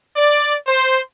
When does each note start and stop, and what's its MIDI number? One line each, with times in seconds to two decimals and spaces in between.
0.16 0.54 74
0.67 0.98 72